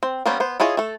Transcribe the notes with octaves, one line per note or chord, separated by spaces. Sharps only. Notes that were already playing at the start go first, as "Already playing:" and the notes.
C4
G3 A#3 B3 C#4 C5
B3 C5
E4 F4 G#4 C#5 D#5
A3 A4